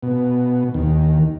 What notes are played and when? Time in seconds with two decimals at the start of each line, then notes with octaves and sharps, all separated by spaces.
0.03 B2
0.74 D#2